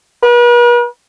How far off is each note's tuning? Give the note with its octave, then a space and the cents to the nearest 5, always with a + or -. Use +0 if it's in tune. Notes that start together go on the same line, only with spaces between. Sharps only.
B4 -45